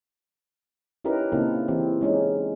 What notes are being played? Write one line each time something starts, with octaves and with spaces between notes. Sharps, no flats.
C#4 D#4 E4 G4 A#4 B4
C#3 A#3 C4 D#4 E4 A4
E3 C4 G4
G#3 C#4 D#4